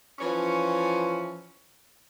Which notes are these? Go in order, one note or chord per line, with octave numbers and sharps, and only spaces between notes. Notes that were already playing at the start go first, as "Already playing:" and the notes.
E3 F3 C#4